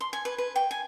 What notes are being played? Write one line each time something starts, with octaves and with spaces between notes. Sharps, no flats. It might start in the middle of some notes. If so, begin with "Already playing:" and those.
C6
G#5
B4
B4
G5
G#5